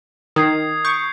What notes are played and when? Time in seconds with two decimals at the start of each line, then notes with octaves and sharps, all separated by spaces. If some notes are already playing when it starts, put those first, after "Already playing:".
0.36 D#3 D#6 G#6 C7
0.85 C#6 G6 D7